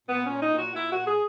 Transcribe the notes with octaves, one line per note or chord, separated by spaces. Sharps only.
A#2 B3
C#4
A#2
D#4
A#2
F#4
A#2 E4
F#4
A#2
G#4